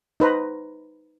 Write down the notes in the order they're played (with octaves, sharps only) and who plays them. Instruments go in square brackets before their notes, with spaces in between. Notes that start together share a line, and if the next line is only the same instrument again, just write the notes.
[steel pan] D#4 B4 C5 A#5